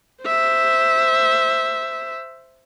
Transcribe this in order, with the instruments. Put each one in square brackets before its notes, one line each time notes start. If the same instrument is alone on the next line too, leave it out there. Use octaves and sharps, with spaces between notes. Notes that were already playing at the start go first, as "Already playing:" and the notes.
[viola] C5 E5